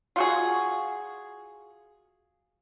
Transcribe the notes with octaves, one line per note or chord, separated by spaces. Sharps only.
F4 F#4 G#4